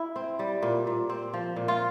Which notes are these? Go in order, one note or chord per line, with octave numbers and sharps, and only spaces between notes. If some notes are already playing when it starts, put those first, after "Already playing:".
Already playing: E4
C4
G3
A#2
A#2
C4
F3
A#2
F4